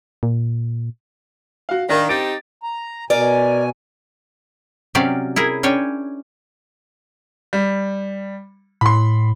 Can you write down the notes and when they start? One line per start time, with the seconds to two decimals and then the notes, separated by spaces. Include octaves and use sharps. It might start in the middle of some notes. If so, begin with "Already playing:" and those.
0.23 A#2
1.69 F#4 F5
1.89 D#3 D4 A#4 F5
2.09 C4 D#4 G4 A6 D7
2.63 A#5
3.10 B2 A#4 D5 G#5
4.95 C3 F#3 C#4 G4 D5 F5
5.36 E4 G#4 A#4
5.63 C#4 D4 C#5 G5 G#5
7.53 G3
8.81 A2 B5 C6